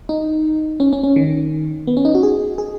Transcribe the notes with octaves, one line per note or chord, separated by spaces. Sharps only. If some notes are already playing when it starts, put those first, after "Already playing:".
D#4
C#4
C#4
C#4
D#3
B3
C#4
D#4
F#4
G#4
G#4